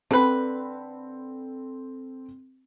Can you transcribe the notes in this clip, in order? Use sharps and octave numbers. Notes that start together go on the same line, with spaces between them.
D3 C4 A4 B4